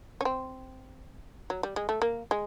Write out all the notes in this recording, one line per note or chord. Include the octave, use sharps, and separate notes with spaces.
C#4
C4
F#3
G3
G#3
A3
A#3
G#3